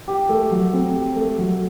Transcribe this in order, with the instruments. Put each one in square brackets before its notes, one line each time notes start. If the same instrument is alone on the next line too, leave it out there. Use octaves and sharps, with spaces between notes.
[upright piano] G4
A3
F#3
C4
G4
A3
F#3